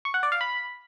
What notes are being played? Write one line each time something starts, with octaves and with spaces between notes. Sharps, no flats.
C#6
F#5
D5
F5
B5